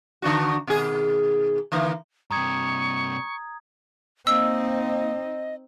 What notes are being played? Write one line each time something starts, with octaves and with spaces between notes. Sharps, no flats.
D3 D4 F#4
B2 D#3 G#4
D3 E3 A#3
G2 C3 A#5 C#6 D#6 G#6
A#3 C4 D#4 D#5 E6